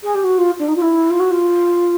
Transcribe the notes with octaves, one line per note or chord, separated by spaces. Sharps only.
G#4
G4
F#4
F4
D4
D#4
F4
E4
F4
F#4
F4